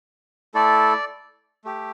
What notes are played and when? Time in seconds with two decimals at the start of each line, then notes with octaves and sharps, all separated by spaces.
0.54 A3 E4 A4 D5
1.65 A3 G4